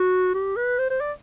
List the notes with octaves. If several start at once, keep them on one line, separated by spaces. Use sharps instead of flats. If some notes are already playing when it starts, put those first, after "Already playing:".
Already playing: F#4
G4
B4
C5
C5
D5